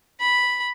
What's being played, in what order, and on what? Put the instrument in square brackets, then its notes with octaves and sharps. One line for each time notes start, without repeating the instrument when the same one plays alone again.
[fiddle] B5